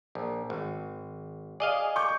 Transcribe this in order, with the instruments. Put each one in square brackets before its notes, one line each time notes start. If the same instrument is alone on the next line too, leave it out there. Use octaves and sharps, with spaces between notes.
[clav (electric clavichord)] A#1
G#1
[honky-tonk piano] G#4 [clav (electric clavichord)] D5 D#5 F5
[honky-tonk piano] C#6 D6 G6